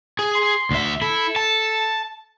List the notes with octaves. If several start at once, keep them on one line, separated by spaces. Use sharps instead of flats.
G#4
C6
D2 E5
E4 A4
A5